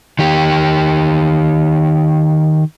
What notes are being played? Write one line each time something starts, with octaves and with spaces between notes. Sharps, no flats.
D#3 G4